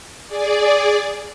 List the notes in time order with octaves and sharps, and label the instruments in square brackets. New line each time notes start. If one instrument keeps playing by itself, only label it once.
[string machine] G#4 D5